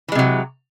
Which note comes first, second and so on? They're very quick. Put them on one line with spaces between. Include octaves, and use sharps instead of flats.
E3 G#3 C3 F#3